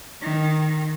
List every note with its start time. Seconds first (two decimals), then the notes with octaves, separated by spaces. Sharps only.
0.21 D#3